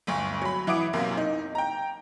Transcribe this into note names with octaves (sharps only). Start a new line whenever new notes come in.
G1 D2 C#6
F#3 B5
E3 E4 F#5 D6 D#6 D7
B1 F#2 C3 A#3
D#4
G5 A#5